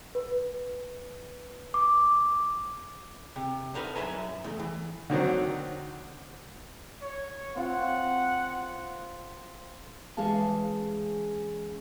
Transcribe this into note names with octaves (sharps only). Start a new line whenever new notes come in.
B4
D6
C3
D3 D#4 A#4 B4
F#2 E5 G#5 A#5
E2 A3
E3
D3 D#3 F#3 C4
C#5
C4 F4 F#5 G5
E3 G#3 C#4 G#4 F5 A5